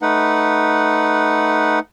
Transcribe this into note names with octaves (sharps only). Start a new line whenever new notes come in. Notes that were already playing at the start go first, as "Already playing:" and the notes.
A3 D#4 B4 F#5